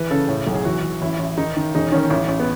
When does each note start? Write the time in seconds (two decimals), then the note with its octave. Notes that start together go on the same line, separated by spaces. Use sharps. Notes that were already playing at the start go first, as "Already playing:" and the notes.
Already playing: E3 B4
0.11 C#3 A4
0.28 A2
0.47 B1
0.55 G#4
0.65 E3 F#4
0.83 E3
1.02 A1 E4
1.19 A1
1.38 D#3 D#4
1.57 D#3
1.75 E1 D#4
1.92 D#3 C#4
2.10 A1
2.29 A1
2.40 B3